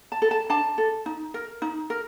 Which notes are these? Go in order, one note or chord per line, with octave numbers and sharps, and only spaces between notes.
A5
A4
A5
D4 A5
A4
D#4
A#4
D#4
A#4